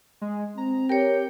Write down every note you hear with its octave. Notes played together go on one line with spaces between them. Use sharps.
G#3
C4 A#5
G4 A#4 C#5 G5